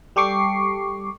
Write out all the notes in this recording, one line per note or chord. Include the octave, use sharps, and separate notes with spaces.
G3 G4 A4 C#6 D6 C7